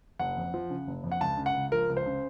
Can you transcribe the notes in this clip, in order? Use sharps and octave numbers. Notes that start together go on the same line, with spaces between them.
F#1 F#5
F2
F3
C#3
F#1
F2
F#5
C#2 A5
C#3
F#5
C#2
F3 A#4
C#2
C5
C#3